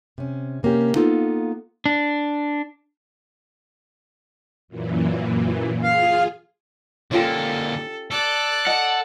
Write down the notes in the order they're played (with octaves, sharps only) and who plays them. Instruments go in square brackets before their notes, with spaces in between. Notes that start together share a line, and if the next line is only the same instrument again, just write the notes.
[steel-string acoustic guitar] C3 C#4
C3 A#3 C#4 G4
A#3 B3 D#4 F4 A4
[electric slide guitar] D4
[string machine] F#2 A#2 E3
[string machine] F4 G#4 [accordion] F5
[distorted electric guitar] D3 A#3 [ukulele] C#4 F4 G4 [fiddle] A4
[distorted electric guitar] A4 [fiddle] D5 F#6
[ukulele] D#5 A5 [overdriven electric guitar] F#5